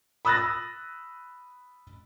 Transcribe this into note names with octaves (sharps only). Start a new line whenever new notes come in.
B5 D#6 E6 F#6 A6 A#6